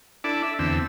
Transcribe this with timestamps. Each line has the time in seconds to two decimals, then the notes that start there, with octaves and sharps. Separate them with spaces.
0.24 D4 E4 A4 D5
0.43 E5
0.59 E2 D3 C4 E6